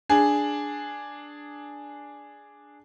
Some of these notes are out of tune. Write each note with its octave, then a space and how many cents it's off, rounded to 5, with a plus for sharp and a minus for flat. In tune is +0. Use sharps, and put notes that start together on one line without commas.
D4 +0 G#4 +0